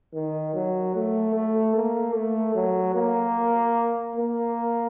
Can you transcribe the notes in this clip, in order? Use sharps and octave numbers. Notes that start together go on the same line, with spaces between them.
D#3
F#3
A3
A3
A#3
A3
F#3
A#3
A#3